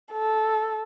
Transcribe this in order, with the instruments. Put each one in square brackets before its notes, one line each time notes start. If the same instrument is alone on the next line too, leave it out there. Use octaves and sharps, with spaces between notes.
[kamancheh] A4